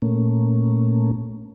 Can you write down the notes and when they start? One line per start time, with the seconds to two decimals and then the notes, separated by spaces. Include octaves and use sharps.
0.02 A#2 A3 A#3 C#4